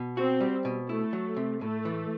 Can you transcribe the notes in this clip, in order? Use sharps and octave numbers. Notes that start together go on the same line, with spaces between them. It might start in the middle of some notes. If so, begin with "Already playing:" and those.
Already playing: B2
C4 F#4
G3
B2
A3 E4
F#3
C3
A2 A3
E3